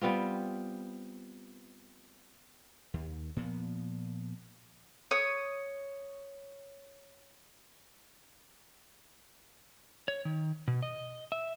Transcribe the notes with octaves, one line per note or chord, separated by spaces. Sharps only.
G3 B3 C4 F4
D#2
A#2 F3 B3
C#5 D#6
C#5
D#3
B2
D#5
E5